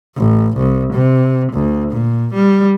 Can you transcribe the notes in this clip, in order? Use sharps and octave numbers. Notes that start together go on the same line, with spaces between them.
A1
C2
C3
D2
A#2
G3